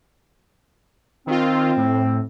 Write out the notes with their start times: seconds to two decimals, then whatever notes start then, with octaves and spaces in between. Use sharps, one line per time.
1.27 D#3 C4 F4
1.77 A2